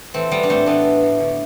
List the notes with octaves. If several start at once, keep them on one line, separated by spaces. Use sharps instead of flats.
E3 A3 C4
E3 G3 B3
D4
A2 A3 C4
E3 B3 D4
E3
A2
D3